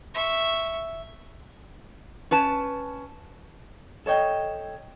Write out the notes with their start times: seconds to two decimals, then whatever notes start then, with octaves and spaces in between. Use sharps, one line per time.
0.14 E5 C#6
2.31 C#4 B4 A5
4.06 A4 C#5 D#5 G5